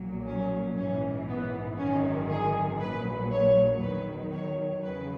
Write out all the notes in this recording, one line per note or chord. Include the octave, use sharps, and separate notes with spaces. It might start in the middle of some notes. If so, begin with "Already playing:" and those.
Already playing: B1 A#2 F#3
C#4
A#1 G#2 E3 C#4
B3
G#1 F#2 D#3 C#4
G#4
A#1 A#2 F#3 B4
C#5
E2 D#3 F#3 B4
C#5
E2 C#3 F#3 B4